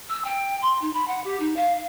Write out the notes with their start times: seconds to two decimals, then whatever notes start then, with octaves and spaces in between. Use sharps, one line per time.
0.09 E6
0.24 G5
0.61 C6
0.81 D#4
0.93 B5
1.07 F#5
1.24 G4
1.39 D#4
1.56 F5